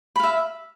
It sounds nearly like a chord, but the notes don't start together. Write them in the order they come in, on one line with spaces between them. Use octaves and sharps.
B5 F5 E5